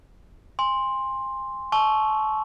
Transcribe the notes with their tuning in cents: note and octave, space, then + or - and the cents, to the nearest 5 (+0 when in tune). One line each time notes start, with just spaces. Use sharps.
G#5 -30 C6 +5
A5 -30 C#6 +5 E6 +0